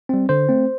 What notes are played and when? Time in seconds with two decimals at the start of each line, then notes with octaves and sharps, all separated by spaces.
0.09 G3 C4
0.29 D3 C5
0.49 A3 C4